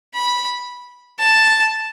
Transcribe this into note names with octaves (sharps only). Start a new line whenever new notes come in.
B5
A5